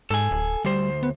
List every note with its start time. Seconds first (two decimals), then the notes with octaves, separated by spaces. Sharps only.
0.11 G#2 A4 G#5
0.31 D1
0.65 D2 G3 C5
1.03 B3